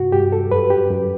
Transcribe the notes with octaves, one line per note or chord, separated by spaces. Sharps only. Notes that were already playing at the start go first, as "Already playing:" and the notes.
Already playing: G2 C3 F#4
G2 G4
A4
F#2 B4
G4
F#2